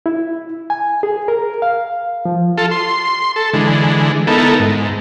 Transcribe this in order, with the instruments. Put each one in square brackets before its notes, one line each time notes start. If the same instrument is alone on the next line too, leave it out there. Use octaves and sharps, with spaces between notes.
[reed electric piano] E4
G#5
G#4
A#4
F5
F3
[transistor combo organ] F4 A4
C6
A4
D3 E3 G#3
B3 D#4 E4 A4 A#4
G#2